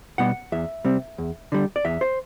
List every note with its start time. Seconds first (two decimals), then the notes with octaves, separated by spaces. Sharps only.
0.18 B2 G3 B3 F#5
0.52 E2 E5
0.85 C3 G3 C4
1.18 E2
1.52 D3 G3
1.76 D5
1.85 E2 E5
2.01 C5